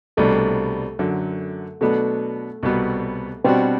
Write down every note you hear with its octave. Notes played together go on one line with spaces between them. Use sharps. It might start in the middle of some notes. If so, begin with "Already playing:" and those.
C2 B2 G3 A3 D4
F#2 D3 F#3
B2 F#3 A3 B3 D4 F#4
C2 B2 G3 B3 F#4
B2 G3 C4 D4 F#4